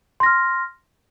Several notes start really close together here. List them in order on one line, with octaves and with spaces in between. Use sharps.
C6 A#6 F6